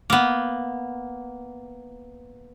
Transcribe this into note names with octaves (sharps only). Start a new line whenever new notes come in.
A#3 B3